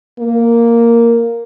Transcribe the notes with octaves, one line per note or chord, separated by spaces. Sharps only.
A#3